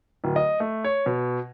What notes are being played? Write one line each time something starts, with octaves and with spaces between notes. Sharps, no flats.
D1
D#5
A3
C#5
B2